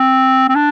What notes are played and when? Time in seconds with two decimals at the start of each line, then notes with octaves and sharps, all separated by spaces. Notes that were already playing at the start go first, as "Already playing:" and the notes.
Already playing: C4
0.48 C4
0.55 D4